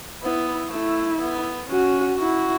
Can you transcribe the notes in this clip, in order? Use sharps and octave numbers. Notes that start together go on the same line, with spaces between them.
B3 E4
A3 E4
B3
C#4 F#4
E4 F#4